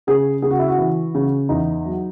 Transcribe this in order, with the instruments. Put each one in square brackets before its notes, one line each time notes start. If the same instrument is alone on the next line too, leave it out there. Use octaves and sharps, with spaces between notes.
[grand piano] C#3 G#4
C#3 G#4
F#4
E4
F#4
E3
C#3
E2 D#4
F#3